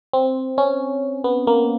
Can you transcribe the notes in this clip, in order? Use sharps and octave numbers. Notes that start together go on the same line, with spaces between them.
C4
C#4
B3
A#3